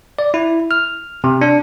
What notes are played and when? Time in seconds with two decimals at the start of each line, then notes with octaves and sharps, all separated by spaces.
0.19 D5
0.34 E4
0.71 F6
1.24 C3
1.41 D4